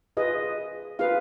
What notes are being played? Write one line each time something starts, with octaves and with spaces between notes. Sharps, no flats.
F4 G#4 B4 D#5
F4 G#4 B4 F5